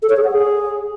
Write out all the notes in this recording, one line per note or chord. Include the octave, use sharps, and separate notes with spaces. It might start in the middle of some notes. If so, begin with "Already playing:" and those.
A4
C#5
G#4
F#5
G#4